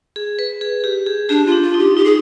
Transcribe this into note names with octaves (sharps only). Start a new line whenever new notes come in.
G#4
B4
G#4
G4
G#4
D4 G4
F4
D4
F4
D#4
G4
D#4 G4
G#4